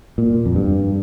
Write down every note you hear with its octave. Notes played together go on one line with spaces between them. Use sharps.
A#2
F2
G2